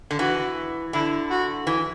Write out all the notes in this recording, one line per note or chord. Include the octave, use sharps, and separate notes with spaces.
D3
E3 F#4
D3 E4
F#4
E3